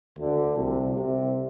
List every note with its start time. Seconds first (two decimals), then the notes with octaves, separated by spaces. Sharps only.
0.19 D2 D3
0.57 C2 C3
0.96 C2 C3